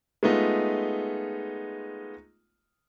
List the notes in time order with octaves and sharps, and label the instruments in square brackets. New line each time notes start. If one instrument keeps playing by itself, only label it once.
[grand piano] G#3 A3 B3 D#4 F4